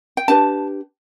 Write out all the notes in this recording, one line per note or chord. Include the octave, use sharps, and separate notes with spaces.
G5
D4 G4 B4 A5